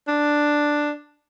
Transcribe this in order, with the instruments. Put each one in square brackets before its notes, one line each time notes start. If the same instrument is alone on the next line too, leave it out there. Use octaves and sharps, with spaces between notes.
[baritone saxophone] D4